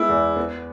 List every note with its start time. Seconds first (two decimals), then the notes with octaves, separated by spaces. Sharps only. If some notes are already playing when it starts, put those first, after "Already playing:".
Already playing: G#3 B3 E4
0.09 E2
0.36 B3